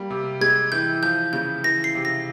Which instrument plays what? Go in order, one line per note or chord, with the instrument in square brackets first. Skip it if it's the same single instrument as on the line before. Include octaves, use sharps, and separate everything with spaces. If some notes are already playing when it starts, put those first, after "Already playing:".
Already playing: [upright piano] G3 A#3
C3
[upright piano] G#3 [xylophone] G#6
[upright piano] E3 [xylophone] G6
[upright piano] F3 [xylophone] G6
[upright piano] C#3 [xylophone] G6
[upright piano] E3 [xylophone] A#6
[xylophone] C7
[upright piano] C3
[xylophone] A#6